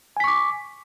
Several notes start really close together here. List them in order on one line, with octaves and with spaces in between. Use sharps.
G#5 B6 C#6 D6